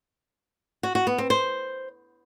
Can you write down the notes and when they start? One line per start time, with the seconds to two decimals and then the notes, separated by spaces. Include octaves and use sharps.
0.83 F#4
0.95 F#4
1.07 B3
1.18 C4
1.30 C5